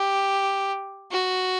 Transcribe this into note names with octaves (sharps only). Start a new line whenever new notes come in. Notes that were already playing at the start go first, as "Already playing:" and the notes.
Already playing: G4
F#4